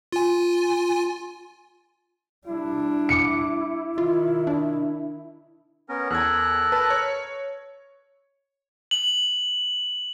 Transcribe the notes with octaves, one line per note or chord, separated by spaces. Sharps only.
F4 G#5
G3 D4 E4
D6 C#7
D#3 F4
D4
B3 C#4 A#4
E2 A4 A#4 F#6 G#6
B4 A5
C#5
F#7